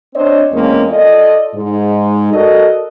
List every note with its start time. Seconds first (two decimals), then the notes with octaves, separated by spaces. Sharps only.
0.15 C4 D4 C5 C#5 D#5
0.52 E2 G#3 A#3 C4 C#4
0.89 F4 A4 D5 D#5
1.54 G#2
2.32 F#4 A4 A#4 D5 D#5